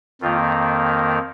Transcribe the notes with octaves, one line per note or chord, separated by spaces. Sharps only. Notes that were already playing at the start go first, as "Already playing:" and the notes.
F2 D#3 A#3 F4